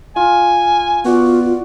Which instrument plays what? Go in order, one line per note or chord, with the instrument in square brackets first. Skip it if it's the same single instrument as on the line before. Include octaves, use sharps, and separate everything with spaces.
[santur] F4 [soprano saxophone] G#5
[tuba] B3 [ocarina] F4 [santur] F#4 D5